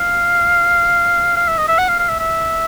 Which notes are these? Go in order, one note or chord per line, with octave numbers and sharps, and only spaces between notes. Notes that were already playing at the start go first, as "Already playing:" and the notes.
Already playing: F5
F5
E5
D#5
E5
F#5
F5
F5
E5
E5